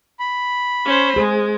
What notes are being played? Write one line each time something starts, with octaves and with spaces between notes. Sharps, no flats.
B5
C#4 C5
G#3 G#4 C5